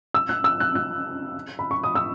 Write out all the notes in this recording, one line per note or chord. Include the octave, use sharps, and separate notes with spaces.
E6
F#6
E6
F#6
F#6
B5
C#6
D#6
E6